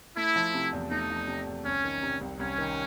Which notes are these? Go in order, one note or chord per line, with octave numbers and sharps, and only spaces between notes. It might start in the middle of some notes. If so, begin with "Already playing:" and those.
A3 E4
F3
C3
E2
A3 D#4
F3
C3
E2
C2 C#4
D#3
C3
C2
C2 C#4
D#3